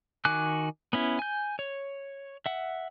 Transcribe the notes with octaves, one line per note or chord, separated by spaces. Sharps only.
D#3 F#4 G#5 D6 F#6
B3 C#4 E4
G#5 G6
C#5
E5 F#5